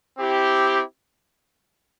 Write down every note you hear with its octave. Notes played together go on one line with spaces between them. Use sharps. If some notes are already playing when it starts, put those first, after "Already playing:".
C4 E4 G4